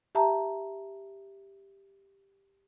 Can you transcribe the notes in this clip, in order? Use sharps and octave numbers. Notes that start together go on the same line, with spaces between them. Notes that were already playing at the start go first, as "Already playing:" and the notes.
G4 E5 A5 A#5